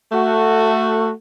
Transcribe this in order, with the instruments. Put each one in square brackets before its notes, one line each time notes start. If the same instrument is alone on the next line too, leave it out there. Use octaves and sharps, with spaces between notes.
[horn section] A3 F#4